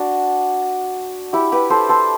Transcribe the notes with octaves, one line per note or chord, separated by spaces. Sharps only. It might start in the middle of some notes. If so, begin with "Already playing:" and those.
Already playing: D4 F#4
E4 G4
G4 B4
A4 C5
A4 C5